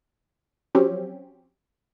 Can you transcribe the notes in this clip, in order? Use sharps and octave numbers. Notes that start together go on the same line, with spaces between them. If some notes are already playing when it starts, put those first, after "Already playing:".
F3 F#3 C4 C#4 G4